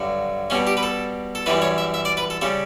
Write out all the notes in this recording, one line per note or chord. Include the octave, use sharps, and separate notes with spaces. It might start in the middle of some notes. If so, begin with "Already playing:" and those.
Already playing: G2 D3 F#3
B2 G3 C#4
G4
B4
A4
A4
F#2 E3 G3 B4
C#5
E5
E5
D5
B4
A4
C#3 G3 A4